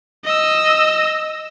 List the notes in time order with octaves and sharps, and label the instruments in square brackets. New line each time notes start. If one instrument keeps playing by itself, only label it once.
[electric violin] D#5 E6